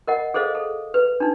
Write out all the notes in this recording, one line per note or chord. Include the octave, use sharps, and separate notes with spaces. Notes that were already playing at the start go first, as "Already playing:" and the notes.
A#4 D#5 F#5
G#4 A4 C5 D#5 F5
A4
B4
D4 D#4